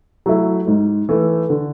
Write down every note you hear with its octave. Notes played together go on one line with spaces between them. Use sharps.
F#3 A3 E4
G#2
E3 A3
D3